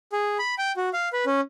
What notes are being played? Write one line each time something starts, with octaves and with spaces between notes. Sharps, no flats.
G#4
B5
G5
F#4
F5
B4
C#4